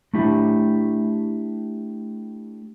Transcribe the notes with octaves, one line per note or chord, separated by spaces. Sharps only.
A3 D4 E4 G4